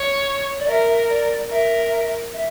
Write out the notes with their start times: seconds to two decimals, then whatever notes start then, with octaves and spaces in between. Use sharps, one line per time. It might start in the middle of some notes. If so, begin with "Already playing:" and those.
Already playing: C#5
0.60 D5
0.67 A#4 E5
1.09 D5
1.50 A#4 E5
2.33 E5